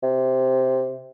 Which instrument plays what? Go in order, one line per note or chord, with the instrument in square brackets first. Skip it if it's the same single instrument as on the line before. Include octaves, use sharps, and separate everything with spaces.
[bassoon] C3